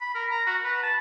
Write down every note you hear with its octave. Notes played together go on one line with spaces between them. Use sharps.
B5
A#4
A#5
F#4
B4
A5